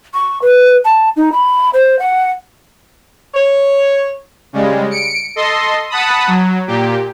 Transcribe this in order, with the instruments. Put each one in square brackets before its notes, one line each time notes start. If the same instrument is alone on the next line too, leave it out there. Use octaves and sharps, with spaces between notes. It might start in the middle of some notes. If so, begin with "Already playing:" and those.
[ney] C#6
B4
A5
D#4
B5
C5
F#5
[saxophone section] C#5
[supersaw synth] C#3 G3 G#3
C#7 D7
A4 D#5 C6
F#5 A5 B5 D#6
F#3
A#2 G4